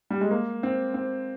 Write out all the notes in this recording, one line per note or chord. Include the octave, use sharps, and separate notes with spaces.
G3
G#3
A#3
C4
C4